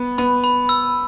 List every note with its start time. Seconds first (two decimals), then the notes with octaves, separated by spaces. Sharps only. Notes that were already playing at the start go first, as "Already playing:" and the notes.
Already playing: B3
0.18 B3 B5
0.44 B5
0.69 E6